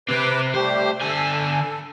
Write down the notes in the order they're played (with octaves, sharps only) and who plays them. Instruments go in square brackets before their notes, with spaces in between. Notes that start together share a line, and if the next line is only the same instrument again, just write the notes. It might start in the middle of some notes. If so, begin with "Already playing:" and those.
[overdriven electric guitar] C3 C4 [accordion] B4 D6
[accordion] G3 A3 G4 [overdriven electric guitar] C5
[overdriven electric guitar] D3 G#5 [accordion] A4